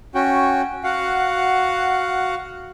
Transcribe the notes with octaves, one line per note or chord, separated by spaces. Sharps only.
C#4 F#4 G5
F#4 F5 F#5